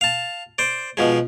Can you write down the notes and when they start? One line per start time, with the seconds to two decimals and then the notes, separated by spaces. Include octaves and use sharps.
0.01 F5 A5
0.58 C5 D5
0.97 B2 F3 G#3